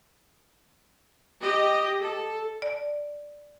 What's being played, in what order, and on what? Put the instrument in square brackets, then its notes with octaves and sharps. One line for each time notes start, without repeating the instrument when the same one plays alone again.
[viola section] G4 D#5
A4
[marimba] D5